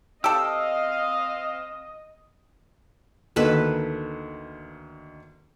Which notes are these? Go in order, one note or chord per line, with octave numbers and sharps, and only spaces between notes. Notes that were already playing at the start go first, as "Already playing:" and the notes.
C4 G4 A4 D#5 F5 E6
D2 D#3 A#3 A4 B4